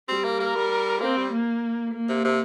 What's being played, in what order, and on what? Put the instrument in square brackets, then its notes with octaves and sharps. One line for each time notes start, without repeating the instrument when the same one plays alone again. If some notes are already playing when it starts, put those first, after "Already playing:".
[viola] G3 [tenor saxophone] C4
[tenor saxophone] A#3
[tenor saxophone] A#3 [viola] A#4
[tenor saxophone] G3
[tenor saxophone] A#3 [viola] C4
[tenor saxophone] G3
[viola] A#3
A#3
[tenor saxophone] C3
C3